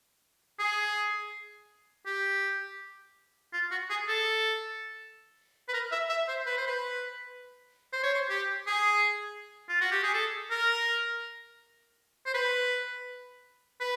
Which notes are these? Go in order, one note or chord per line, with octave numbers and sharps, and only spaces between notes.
G#4
G4
F4
F#4
G#4
A4
B4
A#4
E5
E5
C5
B4
C5
B4
C5
C#5
C5
G4
G#4
F4
F#4
G4
G#4
A4
A#4
C5
B4
B4